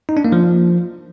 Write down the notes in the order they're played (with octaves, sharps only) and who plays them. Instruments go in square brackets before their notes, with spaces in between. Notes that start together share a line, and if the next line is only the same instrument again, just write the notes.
[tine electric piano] D#4
D4
A#3
F3